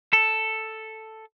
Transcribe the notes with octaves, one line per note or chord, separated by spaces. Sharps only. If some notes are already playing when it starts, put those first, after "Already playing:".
A4